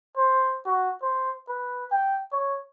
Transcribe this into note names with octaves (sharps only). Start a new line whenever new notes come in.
C5
F#4
C5
B4
G5
C#5